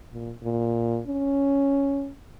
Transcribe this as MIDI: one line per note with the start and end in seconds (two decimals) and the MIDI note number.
0.13 0.33 46
0.43 1.00 46
1.07 2.11 61